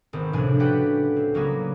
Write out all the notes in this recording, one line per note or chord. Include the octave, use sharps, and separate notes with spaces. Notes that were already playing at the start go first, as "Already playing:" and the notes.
G#1 D#3 B3 C4
C#2 A2 C3 F3 D4 G#5
F#4 G4 A4 B4 F#5 G5
C4
C#3 F#3 G3 A#3 B3 G#4